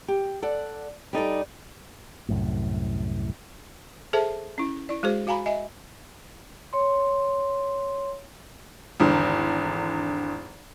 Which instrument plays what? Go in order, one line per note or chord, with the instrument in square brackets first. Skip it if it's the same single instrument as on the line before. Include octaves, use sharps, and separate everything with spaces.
[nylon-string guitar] G4
A4 D5 F#5
G3 D#4 A4 D5
[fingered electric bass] C2 F#2 A2
[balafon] G#4 A4 C5 E5 A5
C#4 E4
E4 D5
G#3 F#4 G#4 C5
F#4 F5 G#5 A#5 B5
D#5 E5 G#5
[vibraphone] C#5 C6
[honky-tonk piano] G#1 E2 D3